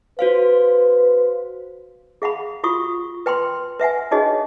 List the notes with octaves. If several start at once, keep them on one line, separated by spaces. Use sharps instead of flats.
F#4 B4 C5 F5
G#4 F5 F#5 B5
F4 F#4 C#6 D#6
B4 G5 B5 C6
B4 E5 F#5 G#5
D4 D#4 F#4 G#4 C#5 D#5